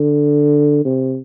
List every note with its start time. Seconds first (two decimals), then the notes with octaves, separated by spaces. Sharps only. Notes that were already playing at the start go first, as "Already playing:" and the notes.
Already playing: D3
0.85 C3